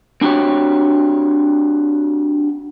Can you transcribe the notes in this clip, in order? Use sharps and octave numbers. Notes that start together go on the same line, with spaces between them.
C4 D4 F#4 G4 C#5